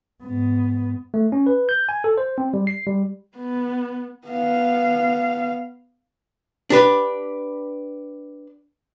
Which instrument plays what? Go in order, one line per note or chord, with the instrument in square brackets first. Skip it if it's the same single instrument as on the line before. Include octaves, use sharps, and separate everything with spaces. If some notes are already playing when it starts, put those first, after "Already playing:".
[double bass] G#2 B3
[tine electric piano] A3
C#4
B4
G6
G#5
A4
C5
C4
G3
C7
G3
[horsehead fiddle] B3
B3 F5
[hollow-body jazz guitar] D4 G4 B4